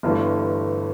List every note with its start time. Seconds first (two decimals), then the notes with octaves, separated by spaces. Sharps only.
0.03 G1 G2 E3 A3